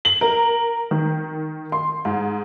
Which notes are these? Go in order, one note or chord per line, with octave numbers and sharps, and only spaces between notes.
F#7
A#4
D#3
C6
G#2